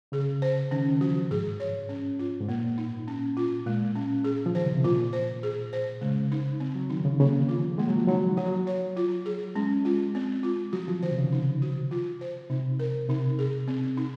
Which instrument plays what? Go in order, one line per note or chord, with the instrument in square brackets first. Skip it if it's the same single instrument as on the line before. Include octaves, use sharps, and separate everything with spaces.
[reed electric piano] C#3 [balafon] G#4
[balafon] C5
[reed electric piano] D#3 [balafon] C#4
[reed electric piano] D#3
[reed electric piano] F3 [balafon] F#4
[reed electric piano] G#2 [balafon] G#4
[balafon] C#5
C#4
F4
[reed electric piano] G#2
[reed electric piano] A#2 [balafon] A#3
[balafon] D#4
C#4
F4
[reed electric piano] A#2 [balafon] G#3
[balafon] C#4
G#4
[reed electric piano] F3
[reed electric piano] D#3 [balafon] C5
[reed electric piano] C#3
C3
[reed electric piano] A#2 [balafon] F4
[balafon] C5
G#4
C5
[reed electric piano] C#3 [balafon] G#3
[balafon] D#4
C4
[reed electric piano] F#3
[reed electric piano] D#3 [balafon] D#4
[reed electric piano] C#3
[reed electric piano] C#3 [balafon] A#3
[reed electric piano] D#3
[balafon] F4
[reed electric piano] F3
[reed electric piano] G#3 [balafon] A#3
[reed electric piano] F#3
F3
[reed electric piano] F#3 [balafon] D#4
[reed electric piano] F#3 [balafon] F#4
[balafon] C#5
F4
G#4
[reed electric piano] G#3 [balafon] C#4
[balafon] F4
C4
F4
[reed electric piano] F#3 [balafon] F#4
[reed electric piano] F3
[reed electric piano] D#3 [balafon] C5
[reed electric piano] C3
C#3
[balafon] D#4
F#4
F4
C5
[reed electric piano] C3 [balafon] D#4
[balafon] A#4
[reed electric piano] C3 [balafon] D#4
[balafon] G#4
C4
D#4